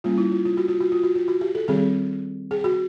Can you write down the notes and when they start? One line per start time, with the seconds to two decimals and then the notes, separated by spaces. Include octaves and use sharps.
0.04 G3 A#3 C#4 F4
0.18 E4
0.32 F4
0.45 F4
0.57 F#4
0.68 F4
0.80 F#4
0.92 F4
1.03 F#4
1.15 F4
1.28 F#4
1.41 G4
1.55 A4
1.68 D#3 G3 C4 G#4
2.51 G#4
2.64 F#4